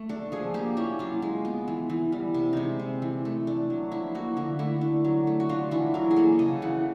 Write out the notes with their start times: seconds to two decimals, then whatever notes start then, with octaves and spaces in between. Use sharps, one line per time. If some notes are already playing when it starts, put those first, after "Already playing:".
Already playing: A3
0.09 D4 A4
0.32 F3 G#4
0.54 A#3 G4
0.77 C#4 E4
0.99 F#3 F4
1.22 G#3
1.45 B3
1.68 E3
1.90 E3
2.12 G3
2.34 C3
2.53 G#3 D#4 E4
2.79 C4
3.02 E3
3.25 A3
3.47 D4
3.70 F#3
3.92 F3 E4
4.15 A#3 F#4
4.37 D3 E4
4.59 A3 E4
4.81 D4
5.04 F#3
5.27 A3
5.40 F#4
5.49 D4 F4
5.71 E3 E4
5.94 F#3 A#4
6.11 G#4
6.16 A#3 A4
6.39 C#3 D#5
6.62 E3 F#5